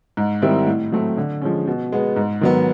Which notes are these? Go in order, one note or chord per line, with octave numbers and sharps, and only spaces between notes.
G#2
D#3 G3 C4 E4
A2
F#3 A3 C4
D3
F3 G#3 C#4
B2
G#3 B3
G#2
D#3 F#3 B3